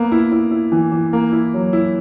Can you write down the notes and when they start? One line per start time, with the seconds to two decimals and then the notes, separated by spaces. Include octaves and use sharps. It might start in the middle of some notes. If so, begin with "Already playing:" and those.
Already playing: A#3 B3
0.12 E4
0.32 E4
0.51 E4
0.72 E3
0.92 E3
1.13 A#3
1.32 E4
1.54 F#3
1.73 E4